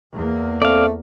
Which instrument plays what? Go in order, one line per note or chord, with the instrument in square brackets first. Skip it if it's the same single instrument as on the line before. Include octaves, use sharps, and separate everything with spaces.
[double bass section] E2 A#3
[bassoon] A3 [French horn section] C4 A4 [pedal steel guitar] D5 F5